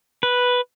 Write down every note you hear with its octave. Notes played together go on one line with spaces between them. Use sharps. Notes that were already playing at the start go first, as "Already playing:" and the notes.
B4